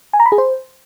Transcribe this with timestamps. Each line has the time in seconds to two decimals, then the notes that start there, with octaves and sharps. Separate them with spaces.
0.13 G#5
0.20 A#5
0.26 B5
0.32 G#4
0.38 C5